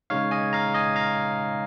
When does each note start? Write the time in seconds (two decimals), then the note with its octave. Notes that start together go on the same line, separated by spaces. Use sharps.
0.10 C#3 G#3 D#4 C#5 F5
0.31 D#5 G#5
0.53 F5 A#5
0.74 D#5 G#5
0.96 F5 A#5